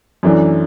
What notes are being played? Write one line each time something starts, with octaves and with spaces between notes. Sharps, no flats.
F#2 E3 A3 D4